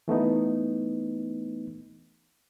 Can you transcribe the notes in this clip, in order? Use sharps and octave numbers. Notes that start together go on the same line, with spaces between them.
E3 A3 B3 D#4